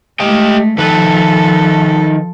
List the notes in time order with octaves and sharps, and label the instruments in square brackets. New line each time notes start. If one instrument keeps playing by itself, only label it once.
[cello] G#3 A3 [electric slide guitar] G4 D#5 G5
[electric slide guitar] D#3 B4 [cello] F3 A4